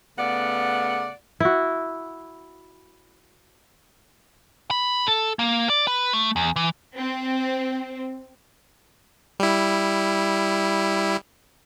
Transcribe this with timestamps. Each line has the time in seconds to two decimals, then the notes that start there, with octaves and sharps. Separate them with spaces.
0.19 C#3 A3 B3 D5 F5 F#5
1.40 E4 F#4
4.71 B5
5.06 A4
5.39 A#3
5.69 D5
5.87 B4
6.13 A3
6.36 E2
6.56 E3
6.96 C4
9.40 G3 E4